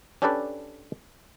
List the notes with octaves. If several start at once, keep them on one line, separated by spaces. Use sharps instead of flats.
C#4 D4 G4 A4 B4 D5